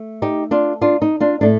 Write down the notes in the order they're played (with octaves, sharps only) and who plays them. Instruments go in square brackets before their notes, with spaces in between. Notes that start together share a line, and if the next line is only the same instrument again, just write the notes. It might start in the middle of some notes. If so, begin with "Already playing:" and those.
Already playing: [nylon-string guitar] A3
D#4 G4
D4 F4
D4 F4
D#4
D4 F4
A2 A3 D4